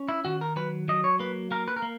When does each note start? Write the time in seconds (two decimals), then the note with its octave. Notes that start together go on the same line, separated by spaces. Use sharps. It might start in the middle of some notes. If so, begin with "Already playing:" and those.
Already playing: C#4
0.09 E4
0.25 D#3 F#4
0.41 A#4
0.56 F#3 B4
0.88 F#3 D#5
1.04 C#5
1.19 A#3 B4
1.51 A#3 A#4
1.68 B4
1.76 A#4
1.82 A#3